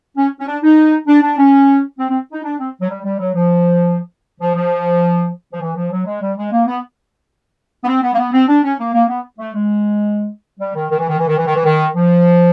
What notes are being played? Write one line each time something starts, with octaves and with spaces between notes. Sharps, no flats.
C#4
C#4
D4
D#4
D4
D4
C#4
C4
C4
D#4
D4
C4
F#3
G3
G3
F#3
F3
F3
F3
F3
E3
F3
F#3
G#3
G3
G#3
A#3
B3
B3
C4
B3
A#3
B3
C4
D4
C#4
A#3
A#3
B3
A3
G#3
G3
D#3
D#3
E3
D#3
E3
D#3
E3
D#3
E3
D#3
F3